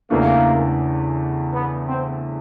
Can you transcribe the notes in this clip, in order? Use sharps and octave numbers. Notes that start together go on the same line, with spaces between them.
E2 C#3 E3 A3 A#3 D4
B3
C4